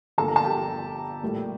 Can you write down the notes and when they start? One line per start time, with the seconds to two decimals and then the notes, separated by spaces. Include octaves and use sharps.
0.18 G1 G2 F3 A#3 A4 A5
0.28 A#5
0.36 A5
0.44 G4 G5
1.23 A#1 A2 G3 A#3